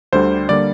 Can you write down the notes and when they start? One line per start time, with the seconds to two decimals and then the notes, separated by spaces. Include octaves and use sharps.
0.12 D2 D3 G3 C5
0.49 D3 G3 A#3 D5